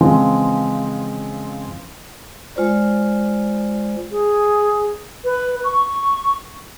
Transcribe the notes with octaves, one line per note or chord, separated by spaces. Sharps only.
C#3 E3 F3 G#3 C4
G#3 F4 C5 D5
G#4
B4
C#6